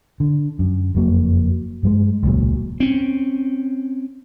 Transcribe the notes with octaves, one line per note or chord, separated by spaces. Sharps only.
D3
F#2
F#1 F2 F#3 A#3
G2 G3 G#3
E1 C#2 A#2 F#3
C4 C#4